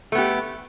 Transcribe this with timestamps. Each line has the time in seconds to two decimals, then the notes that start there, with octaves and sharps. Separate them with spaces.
0.12 A3
0.15 B3
0.18 G4